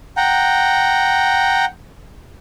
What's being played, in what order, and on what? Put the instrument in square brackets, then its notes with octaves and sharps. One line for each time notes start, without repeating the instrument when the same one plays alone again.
[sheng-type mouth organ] F#5 G5 A#5